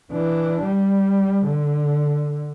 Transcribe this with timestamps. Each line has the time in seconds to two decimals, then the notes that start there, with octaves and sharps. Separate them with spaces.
0.12 E3 D4
0.63 G3
1.46 D3